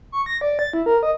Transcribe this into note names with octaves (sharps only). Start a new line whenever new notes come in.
C#6
A#6
D5
A6
E4
A#4
D#5